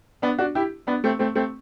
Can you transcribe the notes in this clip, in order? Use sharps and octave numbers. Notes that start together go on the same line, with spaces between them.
B3 D4
D4 F#4
E4 G4
B3 D4
A3 C4
A3 C4
A3 C4